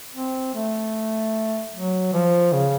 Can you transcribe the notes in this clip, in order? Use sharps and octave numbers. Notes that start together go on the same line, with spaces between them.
C4
A3
F#3
F3
C#3